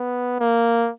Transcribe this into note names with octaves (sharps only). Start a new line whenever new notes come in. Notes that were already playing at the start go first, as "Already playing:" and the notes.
Already playing: B3
A#3